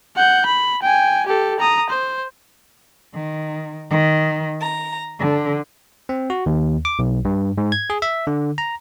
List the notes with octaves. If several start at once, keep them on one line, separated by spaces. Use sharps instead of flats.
F#5 G6
B5
G5 G#5
G4 A4
A#5 D#6
C5
D#3
D#3
A#5
D3
C4
F#4
D#2
D6
B1
G2
G#2
G#6
G#4
E5
D3
A#5